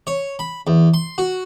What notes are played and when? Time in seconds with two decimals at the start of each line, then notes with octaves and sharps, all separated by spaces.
0.07 C#5
0.39 B5
0.67 E2
0.94 C6
1.18 F#4